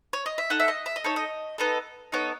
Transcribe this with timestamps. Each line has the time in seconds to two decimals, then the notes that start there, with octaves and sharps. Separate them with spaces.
0.13 C#5
0.26 D#5
0.38 E5
0.50 D#4 A4 F#5
0.60 E5
0.68 D#5
0.86 E5
0.96 D#5
1.04 D#4 A4 C#5
1.16 D#5
1.58 B3 D#4 A4
2.12 B3 D#4 A4 C#5